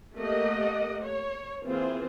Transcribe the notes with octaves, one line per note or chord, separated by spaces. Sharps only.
A3 A#3 G4 A#4 D#5 F#5
C#5
E3 A#3 C4 F4 G#4 C5